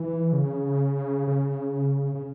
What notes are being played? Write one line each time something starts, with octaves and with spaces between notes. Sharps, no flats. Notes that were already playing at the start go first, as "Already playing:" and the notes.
Already playing: E3
C#3
C#3
C#3